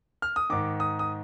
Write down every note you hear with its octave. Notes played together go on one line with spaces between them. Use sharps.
F6
D#6
G#2 D#3 D6
D#6
D#6